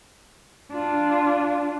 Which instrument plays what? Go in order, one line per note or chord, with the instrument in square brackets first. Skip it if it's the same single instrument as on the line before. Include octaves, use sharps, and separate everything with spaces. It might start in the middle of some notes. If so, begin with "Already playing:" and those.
[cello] D4 F4